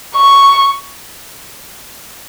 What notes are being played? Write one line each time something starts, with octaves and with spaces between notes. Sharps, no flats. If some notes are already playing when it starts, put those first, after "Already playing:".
C#6